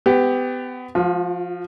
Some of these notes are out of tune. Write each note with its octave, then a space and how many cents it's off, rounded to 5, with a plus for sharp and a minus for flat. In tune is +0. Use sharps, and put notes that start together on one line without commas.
B3 +30 G4 +10
F3 -5 F4 +45